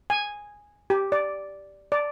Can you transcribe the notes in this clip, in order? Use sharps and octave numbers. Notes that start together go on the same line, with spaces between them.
G#5
G4
D5
D5